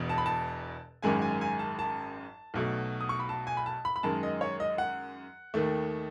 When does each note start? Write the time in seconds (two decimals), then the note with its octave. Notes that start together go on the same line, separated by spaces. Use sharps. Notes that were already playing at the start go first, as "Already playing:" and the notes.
Already playing: E1 E2 B2
0.09 A5
0.18 B5
0.26 A5
1.03 G#1 F#2 D#3 G#3 G#5
1.22 G#5
1.41 G#5
1.59 A5
1.79 A5
2.54 B1 B2 F#3 A3
3.00 D#6
3.09 C#6
3.20 B5
3.29 A5
3.47 G#5
3.57 B5
3.66 A5
3.85 B5
3.96 B5
4.03 F#2 D#3 G#3 A5
4.23 D#5
4.41 C#5
4.60 D#5
4.78 F#5
5.54 D#2 D#3 A3